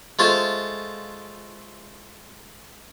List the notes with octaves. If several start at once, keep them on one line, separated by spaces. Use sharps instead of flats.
G#3 A3 F4 C5